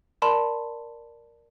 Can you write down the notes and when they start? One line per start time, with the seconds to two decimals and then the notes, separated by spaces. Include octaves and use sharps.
0.22 A#4 D5 A5 B5 C6